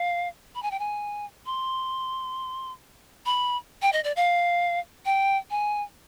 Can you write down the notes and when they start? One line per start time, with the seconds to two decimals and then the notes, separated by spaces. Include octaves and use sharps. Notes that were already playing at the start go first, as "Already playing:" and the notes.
Already playing: F5
0.55 B5
0.63 G#5
0.71 G5
0.79 G#5
1.46 C6
3.26 B5
3.82 G5
3.93 D#5
4.04 D5
4.16 F5
5.05 G5
5.50 G#5